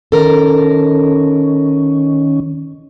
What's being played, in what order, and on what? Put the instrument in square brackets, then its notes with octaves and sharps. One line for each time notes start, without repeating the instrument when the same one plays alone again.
[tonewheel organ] D#3 C#4 [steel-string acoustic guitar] A4 A#4